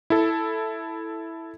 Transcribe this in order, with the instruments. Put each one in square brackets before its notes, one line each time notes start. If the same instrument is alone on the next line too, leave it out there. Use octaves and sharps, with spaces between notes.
[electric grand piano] E4 A4